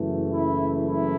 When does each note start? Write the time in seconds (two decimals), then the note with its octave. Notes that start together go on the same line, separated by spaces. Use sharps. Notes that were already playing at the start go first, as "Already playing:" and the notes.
Already playing: F#1 F#2 E3 A3
0.30 E4
0.85 E4